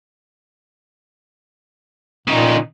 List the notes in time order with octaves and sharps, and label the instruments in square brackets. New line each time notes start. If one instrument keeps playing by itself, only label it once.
[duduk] A#2 [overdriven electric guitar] C#3 D#4